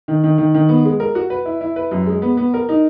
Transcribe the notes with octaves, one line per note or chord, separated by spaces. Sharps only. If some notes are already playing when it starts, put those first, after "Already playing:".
D#3
D#3
D#3
D#3
B3
G#3
A#4
F#4
B4
E4
E4
B4
F#2
G#3
B3
B3
A#4
D#4